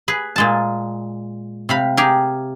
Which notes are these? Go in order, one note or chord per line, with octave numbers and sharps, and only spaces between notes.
G#4 B4
A#2 G#3 A5
C3 F5 B5
G4 G#4 A#4